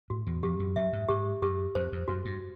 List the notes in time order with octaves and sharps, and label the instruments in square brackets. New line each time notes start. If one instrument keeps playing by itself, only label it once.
[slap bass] A2 [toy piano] F#4
[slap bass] E2
[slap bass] F2 [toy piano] G4
[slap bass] F#2
[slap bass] F#2 [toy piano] E5
[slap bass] G#2
[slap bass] G#2 [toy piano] G4
[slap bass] F#2 [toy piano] G4
[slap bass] F2 [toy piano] C5
[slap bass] F2
[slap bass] F#2 [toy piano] F#4
[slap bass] G2